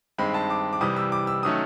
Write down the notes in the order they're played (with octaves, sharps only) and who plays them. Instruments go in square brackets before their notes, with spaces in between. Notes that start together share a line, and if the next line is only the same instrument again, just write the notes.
[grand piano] G2 D#3 G#3 C4 B5
A5
D6
D6
C2 C3 E3 G3 D#6
E6
D6
E6
D#3 F#3 A3 C#4 D#6